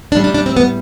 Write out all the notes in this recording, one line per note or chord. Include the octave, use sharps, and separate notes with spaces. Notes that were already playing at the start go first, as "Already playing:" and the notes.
A2 G3 D4
D4
D4
C4
B3